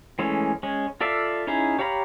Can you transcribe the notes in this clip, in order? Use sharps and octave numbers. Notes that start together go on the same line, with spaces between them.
E3 G#3 A3 C#4
G#3 C#4
F4 A4 D5 E5 F5
C#4 D#4 E4 G#4
G4 C#5 F5 A#5 B5